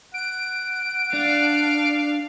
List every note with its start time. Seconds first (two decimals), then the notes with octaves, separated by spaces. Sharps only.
0.14 F#5 D7
1.13 D4 F5